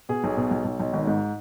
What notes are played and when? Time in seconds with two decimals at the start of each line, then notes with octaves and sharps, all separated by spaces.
0.09 B2 G#4
0.24 B1
0.37 B2
0.51 B1
0.65 B1
0.80 B1
0.93 G#1
1.07 G#2